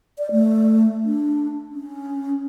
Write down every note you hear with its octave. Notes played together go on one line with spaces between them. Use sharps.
D5
A3
D4
C#4